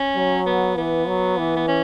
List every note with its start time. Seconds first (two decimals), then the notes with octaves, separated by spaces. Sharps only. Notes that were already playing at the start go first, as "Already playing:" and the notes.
Already playing: C#4
0.16 F#3
0.46 B3
0.77 E3 B3
1.07 F#3
1.38 E3
1.56 B3
1.68 C#4